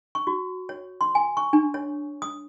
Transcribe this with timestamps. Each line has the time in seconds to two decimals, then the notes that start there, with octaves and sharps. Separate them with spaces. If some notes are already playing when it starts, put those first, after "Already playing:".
0.15 C#6
0.27 F#4
0.69 C#5
1.01 C6
1.15 G#5
1.37 C#6
1.53 D4
1.74 C#5
2.22 D#6